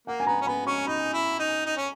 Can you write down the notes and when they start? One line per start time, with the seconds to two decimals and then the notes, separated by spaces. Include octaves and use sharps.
0.07 A#3 F#5
0.20 G#5
0.27 B3 A#5
0.41 C#4
0.47 B3 B5
0.66 C#4 C#6
0.87 D#4 B5
1.13 E4
1.39 D#4
1.66 D#4
1.77 C#4